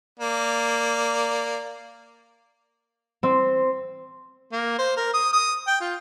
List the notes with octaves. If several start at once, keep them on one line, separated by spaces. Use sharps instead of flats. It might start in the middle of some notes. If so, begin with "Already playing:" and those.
A#3 D5
C4
A#3
C5
A#4
D#6
D#6
G5
F4